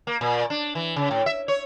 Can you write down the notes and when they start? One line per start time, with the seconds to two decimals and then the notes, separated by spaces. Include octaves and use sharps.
0.07 A#3
0.21 A#2
0.50 D4
0.75 E3
0.96 C#3
1.11 A2
1.26 E5
1.48 C#5